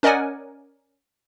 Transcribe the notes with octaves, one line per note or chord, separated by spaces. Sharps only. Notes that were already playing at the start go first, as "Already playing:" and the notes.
C#4 A#4 D5 D#5 F#5 G#5